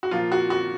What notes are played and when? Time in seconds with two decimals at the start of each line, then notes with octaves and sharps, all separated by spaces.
0.03 F#4
0.11 A#2 F3 F4
0.32 F#4
0.50 F#4